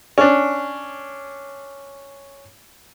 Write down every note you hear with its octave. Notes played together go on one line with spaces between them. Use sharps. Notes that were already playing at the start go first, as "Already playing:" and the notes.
C#4 D4